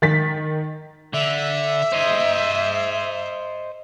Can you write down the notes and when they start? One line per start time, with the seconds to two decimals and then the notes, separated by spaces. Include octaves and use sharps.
0.02 D#3 A6 B6
1.13 D3 E5
1.92 C5 D#5